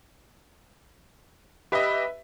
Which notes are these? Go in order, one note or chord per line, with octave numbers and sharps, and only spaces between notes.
G4 B4 D#5 E5